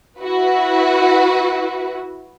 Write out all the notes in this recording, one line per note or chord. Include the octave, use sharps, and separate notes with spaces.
E4 F#4 B4